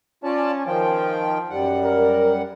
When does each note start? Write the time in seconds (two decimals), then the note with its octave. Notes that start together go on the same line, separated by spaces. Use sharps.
0.24 C#4 F4 D5 A5
0.66 D#3 F3 G5
1.50 F#2 G3 F#5
1.85 A#4